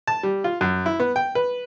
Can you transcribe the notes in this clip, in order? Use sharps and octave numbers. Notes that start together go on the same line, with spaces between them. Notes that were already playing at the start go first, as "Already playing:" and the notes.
A5
G3
F4
F#2
E4
B3
G5
B4